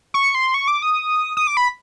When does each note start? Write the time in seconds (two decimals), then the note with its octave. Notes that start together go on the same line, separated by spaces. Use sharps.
0.14 C#6
0.35 C6
0.54 C#6
0.68 D6
0.82 D#6
1.37 D#6
1.47 D6
1.57 B5